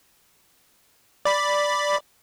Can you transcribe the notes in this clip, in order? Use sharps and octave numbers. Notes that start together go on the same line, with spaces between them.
D5 B5